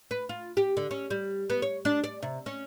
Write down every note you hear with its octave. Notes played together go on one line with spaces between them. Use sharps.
B4
F4
G4
D3
C#4
G3
B3
C#5
D4
D5
C3
C#4